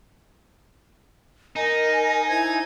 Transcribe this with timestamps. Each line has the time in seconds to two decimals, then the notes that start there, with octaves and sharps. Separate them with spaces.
1.56 D#4 A#4 D#5 G#5
2.29 E4 C5 D#5 G#6